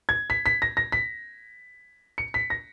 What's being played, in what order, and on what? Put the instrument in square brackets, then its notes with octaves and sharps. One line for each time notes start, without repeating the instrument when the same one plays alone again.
[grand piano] G#6
B6
B6
A#6
A#6
B6
C#7
B6
A#6